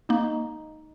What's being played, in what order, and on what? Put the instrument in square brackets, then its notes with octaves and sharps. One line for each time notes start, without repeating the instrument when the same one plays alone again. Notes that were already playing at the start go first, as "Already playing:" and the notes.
[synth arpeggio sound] A#3 [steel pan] D#4